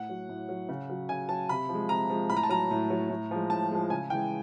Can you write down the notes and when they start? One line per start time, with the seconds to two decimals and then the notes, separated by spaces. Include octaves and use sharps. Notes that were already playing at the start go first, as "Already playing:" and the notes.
Already playing: A2 F#5
0.09 F#3
0.29 A2
0.49 F#3
0.69 C#3
0.90 F#3
1.09 C#3 G#5
1.29 F#3 A5
1.49 C3 B5
1.69 F3
1.74 G#3
1.89 C3 A#5
2.09 F3 G#3
2.30 A2 B5
2.37 A#5
2.43 A5
2.49 F#3 A#5
2.71 A2
2.90 F#3
3.10 A2
3.31 F3 G#3
3.50 A2 A5
3.71 F3 G#3
3.90 C#3 G#5
4.10 E3 G#3 G5